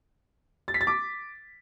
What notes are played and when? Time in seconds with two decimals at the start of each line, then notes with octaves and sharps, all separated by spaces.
0.68 A6
0.74 B6
0.81 A6
0.87 D6